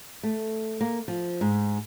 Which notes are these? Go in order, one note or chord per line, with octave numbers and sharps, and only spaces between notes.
A3
A#3
F3
G#2